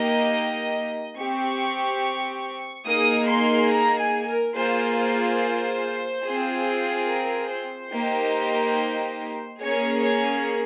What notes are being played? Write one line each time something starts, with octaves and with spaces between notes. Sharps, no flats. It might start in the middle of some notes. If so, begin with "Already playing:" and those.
Already playing: A#3 D#4 G4 D#5
C4 G4 C#6
A#3 D#4 G#4 D#6
C6
A#5
G#5
A#4
A#3 F4 G#4 C5
C5
C4 F4 G#4
A#4
C5
A#3 D#4 G4
A#3 C#4 G#4 C#5
C#5